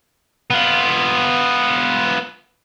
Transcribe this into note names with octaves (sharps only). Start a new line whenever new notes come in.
B3 F4